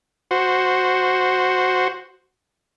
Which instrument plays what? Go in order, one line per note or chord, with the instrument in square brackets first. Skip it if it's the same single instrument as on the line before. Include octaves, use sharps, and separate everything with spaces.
[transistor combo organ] F#4 C5